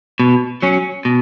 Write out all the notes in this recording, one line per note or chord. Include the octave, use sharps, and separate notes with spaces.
B2
F#3 C#4
B2